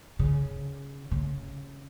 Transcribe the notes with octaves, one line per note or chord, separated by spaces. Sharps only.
C#3
C#3